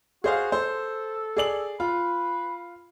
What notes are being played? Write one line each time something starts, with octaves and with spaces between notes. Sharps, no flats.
F#4 G#4 C5 F5
A4 C5
G#4 D5 F#7
F4 B4